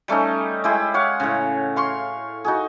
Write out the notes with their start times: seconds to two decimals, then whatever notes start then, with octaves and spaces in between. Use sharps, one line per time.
0.08 G3 A3 C#4 D#4
0.64 G#3 E4 G4
0.94 C#5 F5 F#5
1.20 A2 C#3
1.76 F5 C6 C#6
2.45 D#4 F#4 G#4